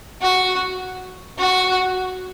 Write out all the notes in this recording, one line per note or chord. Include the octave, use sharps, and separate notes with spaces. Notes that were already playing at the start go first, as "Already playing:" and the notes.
F#4
F#4